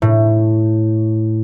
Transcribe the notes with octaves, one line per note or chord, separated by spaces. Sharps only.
A2